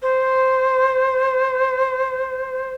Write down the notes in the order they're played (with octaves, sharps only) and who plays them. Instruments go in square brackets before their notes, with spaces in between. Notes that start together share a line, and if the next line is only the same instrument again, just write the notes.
[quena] C5